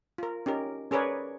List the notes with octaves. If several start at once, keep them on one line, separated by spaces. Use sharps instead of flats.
F4 A#4
C#4 D#4 G4 A#4
C#4 G#4 A#4 B4 C#5 D5